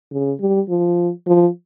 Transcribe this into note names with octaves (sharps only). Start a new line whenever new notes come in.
C#3
G3
F3
F3